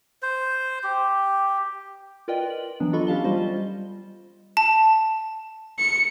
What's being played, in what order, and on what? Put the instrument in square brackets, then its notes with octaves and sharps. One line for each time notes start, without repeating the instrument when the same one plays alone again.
[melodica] C5
G4
[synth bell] F4 A#4 B4 D5 D#5 G5
F#7
E3 F#3 B3 D4
F4 A4 D#5 B5 C#6
C#4 G4 F5 A5 G7
G3 F4 C5 D#5
[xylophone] A5
[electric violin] C#7